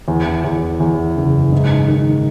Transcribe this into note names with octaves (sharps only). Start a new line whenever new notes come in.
E2
E2
E2
F#1
G#2
D#3